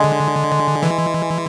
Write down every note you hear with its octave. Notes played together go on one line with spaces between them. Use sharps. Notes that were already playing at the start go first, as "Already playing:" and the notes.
Already playing: D3 G#3
E3